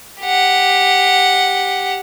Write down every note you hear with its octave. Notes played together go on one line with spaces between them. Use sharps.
G4 F#5